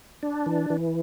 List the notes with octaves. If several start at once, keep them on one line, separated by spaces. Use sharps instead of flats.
D4
E3
E3